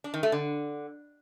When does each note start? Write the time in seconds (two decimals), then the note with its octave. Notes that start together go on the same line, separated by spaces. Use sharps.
0.04 D4
0.14 D#3
0.23 A3
0.32 D3